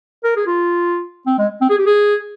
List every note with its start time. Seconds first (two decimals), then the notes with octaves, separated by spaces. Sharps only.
0.24 A#4
0.36 G#4
0.47 F4
1.26 C4
1.39 G#3
1.61 C4
1.69 G#4
1.78 G4
1.86 G#4